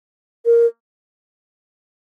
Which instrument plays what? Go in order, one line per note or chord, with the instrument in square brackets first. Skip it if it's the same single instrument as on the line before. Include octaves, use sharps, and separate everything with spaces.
[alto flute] A#4